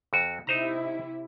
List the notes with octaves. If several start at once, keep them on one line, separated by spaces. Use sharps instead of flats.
F2 F#4
C3 D#4 E4 C5 A#5